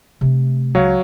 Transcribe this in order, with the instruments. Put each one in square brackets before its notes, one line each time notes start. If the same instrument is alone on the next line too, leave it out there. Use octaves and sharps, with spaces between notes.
[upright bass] C3 A3
[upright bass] C#2 [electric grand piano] F#3 C#5 F5